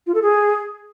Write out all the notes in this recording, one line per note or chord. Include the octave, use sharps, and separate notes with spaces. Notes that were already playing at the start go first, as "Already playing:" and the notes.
F4
A4
G#4